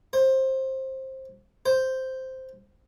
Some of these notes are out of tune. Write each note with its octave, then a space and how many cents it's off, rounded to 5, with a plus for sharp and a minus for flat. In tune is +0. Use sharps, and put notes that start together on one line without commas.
C5 +15
C5 -5